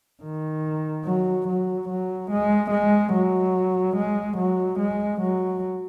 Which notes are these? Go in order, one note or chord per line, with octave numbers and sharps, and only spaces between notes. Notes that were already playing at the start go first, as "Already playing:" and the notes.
D#3
F#3
F#3
F#3
G#3
G#3
F#3
G#3
F#3
G#3
F#3